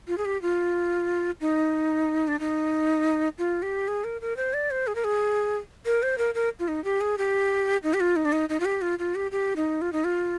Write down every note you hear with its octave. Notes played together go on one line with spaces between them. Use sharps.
F4
G#4
G4
F4
D#4
D4
D#4
F4
G4
G#4
A#4
A#4
C5
D5
C5
G#4
A#4
G#4
A#4
C5
A#4
A#4
F4
D#4
G4
G#4
G4
D#4
G4
F4
D#4
D4
D#4
D#4
F4
G4
F4
F4
G4
G4
D#4
F4
D#4
F4